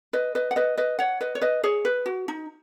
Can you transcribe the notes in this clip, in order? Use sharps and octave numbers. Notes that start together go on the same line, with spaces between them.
B4 D#5
B4 D#5
F#5
B4 D#5
B4 D#5
C#5 F#5
B4 D#5
C#5
B4 D#5
G#4 C#5
B4
F#4
D#4